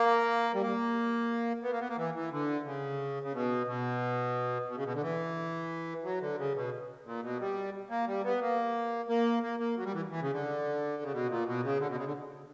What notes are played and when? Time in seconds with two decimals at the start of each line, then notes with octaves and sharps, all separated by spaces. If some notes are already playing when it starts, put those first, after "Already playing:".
Already playing: A#3
0.54 G3
0.61 A#3
1.63 B3
1.72 A#3
1.80 B3
1.89 A#3
1.97 E3
2.14 E3
2.31 D3
2.65 C#3
3.23 C#3
3.33 B2
3.67 B2
4.68 B2
4.76 C#3
4.85 B2
4.94 D3
5.02 E3
6.04 F#3
6.21 D3
6.38 C#3
6.55 B2
7.05 A#2
7.22 B2
7.40 G3
7.90 A#3
8.07 G3
8.24 B3
8.41 A#3
9.09 A#3
9.43 A#3
9.60 A#3
9.76 F#3
9.85 G3
9.94 E3
10.10 E3
10.21 C#3
10.33 D3
11.03 C#3
11.12 B2
11.29 A#2
11.46 B2
11.63 C#3
11.80 D3
11.89 B2
11.97 C#3
12.05 D3